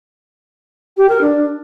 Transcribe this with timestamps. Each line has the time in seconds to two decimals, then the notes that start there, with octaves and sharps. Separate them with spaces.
0.97 G4
1.09 A#4
1.21 D4